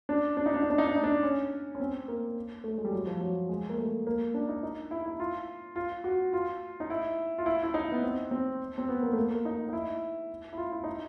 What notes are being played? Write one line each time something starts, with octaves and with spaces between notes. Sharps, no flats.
D4
D4
D#4
D4
D#4
D4
D#4
D4
D#4
D4
C#4
C#4
C4
A#3
A3
G#3
G3
F#3
F3
F#3
G#3
A#3
A3
A#3
D4
D#4
D#4
E4
E4
F4
F4
F#4
F4
D#4
E4
F4
E4
E4
D#4
B3
C4
C4
C4
B3
A#3
A3
A#3
A#3
D#4
D#4
E4
E4
F4
E4
D#4